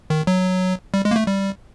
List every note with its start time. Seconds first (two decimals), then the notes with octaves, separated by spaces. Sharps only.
0.10 D#3
0.27 F#3
0.94 G3
1.05 G#3
1.11 A#3
1.16 A3
1.27 G3